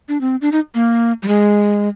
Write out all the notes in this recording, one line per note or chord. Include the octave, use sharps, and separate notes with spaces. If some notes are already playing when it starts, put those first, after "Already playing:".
D4
C4
D4
D#4
A#3
G3
G#3